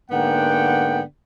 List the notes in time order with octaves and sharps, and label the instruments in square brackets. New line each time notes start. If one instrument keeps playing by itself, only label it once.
[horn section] G#2 D3 A#3 B3 F#5 G5